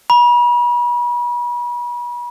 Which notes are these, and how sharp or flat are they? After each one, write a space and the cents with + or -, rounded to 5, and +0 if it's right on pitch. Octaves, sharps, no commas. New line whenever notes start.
B5 -40